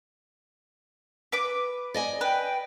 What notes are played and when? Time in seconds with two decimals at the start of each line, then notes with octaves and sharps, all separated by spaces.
1.32 B4 D6
1.94 D5 D#5 G#5
2.21 B4 G5